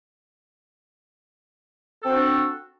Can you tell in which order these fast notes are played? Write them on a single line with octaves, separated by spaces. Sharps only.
A4 C4 F#4 D4